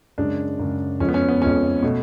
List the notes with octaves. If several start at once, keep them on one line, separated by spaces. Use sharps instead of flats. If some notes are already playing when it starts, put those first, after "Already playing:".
F#2 C#3 G#3 D4
F#2 C#3 G#3
F2 F3 G#3 C#4
B3
C#4
B3
F2 F3 G#3 C#4
B2 A3